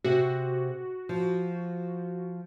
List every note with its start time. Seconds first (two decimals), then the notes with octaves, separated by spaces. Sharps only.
0.04 C3 C4 F#4 G#4
1.09 F3